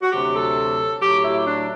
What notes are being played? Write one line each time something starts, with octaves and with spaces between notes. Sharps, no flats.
F#4
D2 C3 F#3 G4
A4
A2 F#3 A3 G4
E4
D4